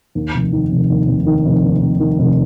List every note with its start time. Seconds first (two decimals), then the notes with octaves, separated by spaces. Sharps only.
0.15 D#2
0.34 F1
0.53 D#3
0.71 F1
0.90 D#2
1.08 F1
1.26 D#3
1.46 F1
1.64 D#2
1.82 F1
2.00 D#3
2.19 F1